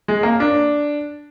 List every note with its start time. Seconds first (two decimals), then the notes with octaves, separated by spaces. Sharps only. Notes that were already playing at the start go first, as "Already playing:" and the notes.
0.08 G#3
0.23 A#3
0.40 D4